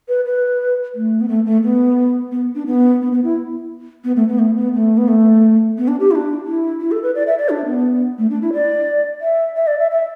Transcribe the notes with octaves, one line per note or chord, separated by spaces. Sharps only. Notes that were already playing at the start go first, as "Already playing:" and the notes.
B4
B4
A3
B3
A3
A3
B3
B3
D4
B3
B3
B3
E4
B3
A3
B3
A3
B3
A3
B3
A3
B3
D4
G4
E4
D4
E4
E4
A4
B4
D5
E5
D5
D4
B3
A3
D4
E4
D5
E5
E5
D5
E5
E5